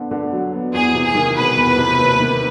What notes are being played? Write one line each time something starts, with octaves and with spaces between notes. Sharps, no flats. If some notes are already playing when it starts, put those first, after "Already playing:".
Already playing: D3 B3
D3
F#3
B3
E2 G#4
C3
G#4
D#3
E1 B4
E2
C3
D#2
D#3